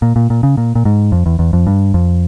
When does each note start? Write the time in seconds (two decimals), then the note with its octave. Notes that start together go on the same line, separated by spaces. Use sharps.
0.02 A#2
0.16 A#2
0.30 A#2
0.43 C#3
0.57 A#2
0.75 A#2
0.85 G#2
1.12 F2
1.26 E2
1.39 E2
1.53 F2
1.67 G2
1.94 F2